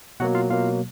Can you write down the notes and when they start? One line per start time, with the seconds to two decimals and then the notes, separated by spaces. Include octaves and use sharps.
0.20 B2 F#3 A#3 F#4 F#5
0.35 F4 F5
0.50 B2 F#3 A#3 F4 F5